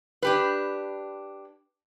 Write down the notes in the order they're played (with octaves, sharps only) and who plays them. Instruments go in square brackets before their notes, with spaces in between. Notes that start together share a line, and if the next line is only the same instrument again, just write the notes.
[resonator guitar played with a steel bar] D4 G4 B4